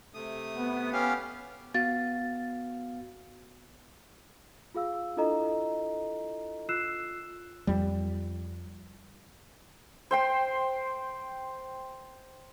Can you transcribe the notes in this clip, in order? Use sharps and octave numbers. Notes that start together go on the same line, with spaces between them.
C3 A3 D#6
B3
C#4 G4 F5
B3 F#4 F5 A6
F4 G#4 F5 E6
D4 E4 F4 A4 D#5 A#5
F4 E6 F#6 C7 E7
F2 G3
C5 G5 C6